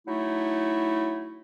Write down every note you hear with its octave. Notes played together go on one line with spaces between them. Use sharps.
F#3 A3 D#4 E4